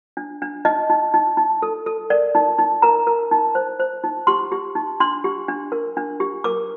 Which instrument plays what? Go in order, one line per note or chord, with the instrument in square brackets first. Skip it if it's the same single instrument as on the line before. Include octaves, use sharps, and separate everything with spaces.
[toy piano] D4
D4
D#4 D#5
D#4
D#4
D#4
A4
A4
A#4 D5
D#4
D#4
A#4 A#5
A#4
D#4
C5
C5
D#4
G4 C6
G4
D#4
D4 C6
G4
D4
A#4
D4
G4
A#4 D6